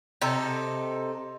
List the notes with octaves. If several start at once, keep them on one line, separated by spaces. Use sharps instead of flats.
C3 D#4 A4